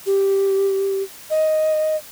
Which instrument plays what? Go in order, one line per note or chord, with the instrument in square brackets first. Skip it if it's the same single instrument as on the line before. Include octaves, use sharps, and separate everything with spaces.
[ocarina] G4
D#5